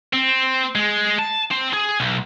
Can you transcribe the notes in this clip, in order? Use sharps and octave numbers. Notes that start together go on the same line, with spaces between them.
C4
G#3
A5
C4
G#4
B1